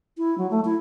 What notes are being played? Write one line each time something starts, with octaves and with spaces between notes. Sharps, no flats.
E4
F#3
A3
E4